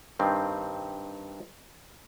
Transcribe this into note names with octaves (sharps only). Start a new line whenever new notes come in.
G2 D#3 C4